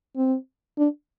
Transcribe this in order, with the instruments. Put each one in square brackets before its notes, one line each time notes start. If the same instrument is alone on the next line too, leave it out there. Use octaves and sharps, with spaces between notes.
[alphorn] C4
D4